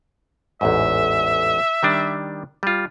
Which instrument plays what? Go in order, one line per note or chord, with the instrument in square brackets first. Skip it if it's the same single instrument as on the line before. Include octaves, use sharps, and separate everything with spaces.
[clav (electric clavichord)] A1 E2 G#2 [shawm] E5
[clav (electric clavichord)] D#3 G3 D4
G3 F4